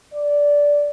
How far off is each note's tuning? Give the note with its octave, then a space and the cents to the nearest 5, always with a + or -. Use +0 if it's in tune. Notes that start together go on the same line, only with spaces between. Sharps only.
D5 -10